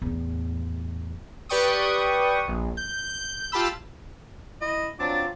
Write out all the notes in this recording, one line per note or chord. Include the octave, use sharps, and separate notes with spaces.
E2 A2
G4 B4 D5 G5 C#6 D#6
A#1
G6
F4 G4 A5 B5 E6
E4 D#5
F#3 C4 D4 F4 D6 A6